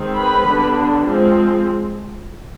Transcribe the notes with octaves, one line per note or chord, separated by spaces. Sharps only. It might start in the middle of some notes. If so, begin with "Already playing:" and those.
Already playing: D#3 G#3 C4
B4 B5
D3 G3 B3 D4
F3 G#3 C4